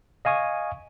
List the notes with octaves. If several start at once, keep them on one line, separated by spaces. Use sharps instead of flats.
D#5 F5 G#5 C#6 D#6